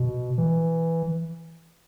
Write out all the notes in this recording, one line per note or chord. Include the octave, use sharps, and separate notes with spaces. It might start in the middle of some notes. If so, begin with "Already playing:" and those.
Already playing: B2
E3